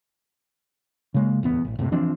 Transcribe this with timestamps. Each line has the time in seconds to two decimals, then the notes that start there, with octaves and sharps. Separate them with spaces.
1.14 C#3 G#3 A#3
1.43 D1 E2 B3
1.65 A1
1.79 F#1 A2 C3
1.92 E3 F3 C4 D4